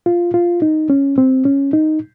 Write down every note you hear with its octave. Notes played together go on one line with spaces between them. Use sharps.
F4
F4
D#4
C#4
C4
C#4
D#4